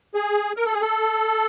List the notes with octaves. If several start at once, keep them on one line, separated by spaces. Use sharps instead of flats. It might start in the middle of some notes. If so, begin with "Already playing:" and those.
G#4
A#4
A4
G#4
A4